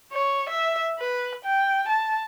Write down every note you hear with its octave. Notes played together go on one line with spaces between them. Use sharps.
C#5
E5
B4
G5
A5